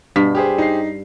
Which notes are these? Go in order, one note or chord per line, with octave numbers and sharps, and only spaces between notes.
G2 B2 B6
G4 G#4 C5
D#4 C7